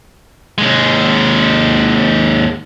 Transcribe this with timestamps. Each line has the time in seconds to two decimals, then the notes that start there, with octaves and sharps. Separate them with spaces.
0.58 D#2 G#3